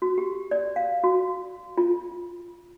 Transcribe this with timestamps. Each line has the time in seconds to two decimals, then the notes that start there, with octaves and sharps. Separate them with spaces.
0.02 F#4
0.18 G4
0.51 D5
0.76 F5
1.04 F#4
1.78 F4